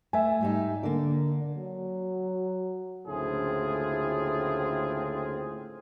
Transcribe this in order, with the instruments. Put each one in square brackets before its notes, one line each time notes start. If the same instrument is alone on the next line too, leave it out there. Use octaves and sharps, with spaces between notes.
[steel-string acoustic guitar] A3 [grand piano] E5 G#5
[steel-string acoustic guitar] G#2 G3 D#4
[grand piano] D3 [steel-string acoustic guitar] A#3 D5
[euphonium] F#3
[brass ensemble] F#1 D2 A2 C4 F4 G#4